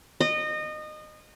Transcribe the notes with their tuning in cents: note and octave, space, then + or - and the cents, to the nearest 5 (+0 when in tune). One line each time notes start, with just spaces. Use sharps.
D#5 -25